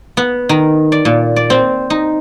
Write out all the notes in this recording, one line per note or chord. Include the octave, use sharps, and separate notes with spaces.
B3
D#3
D5
A#2
D5
C4
D#4